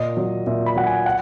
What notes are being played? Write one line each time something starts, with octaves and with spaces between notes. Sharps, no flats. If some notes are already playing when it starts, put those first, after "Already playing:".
Already playing: A#2 D#5
F#3
A#2 E5
B5
F#3 F#5
G#5
F#5